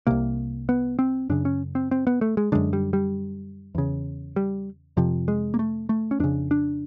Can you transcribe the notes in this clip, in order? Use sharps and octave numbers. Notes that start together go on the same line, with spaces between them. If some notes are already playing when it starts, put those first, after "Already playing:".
C2 C3 A#3
B3
C4
F#2 C#3 D4
C#4
C4
C4
B3
A3
G#3
F#2 D3 G#3
G3
G3
E2 C#3
G3
F2 C3 F3
G#3
A#3
A3
A3
C#4
F2 C#3 D4
D4